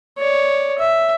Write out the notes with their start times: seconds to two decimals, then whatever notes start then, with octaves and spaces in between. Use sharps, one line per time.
0.18 C#5 D5
0.79 E5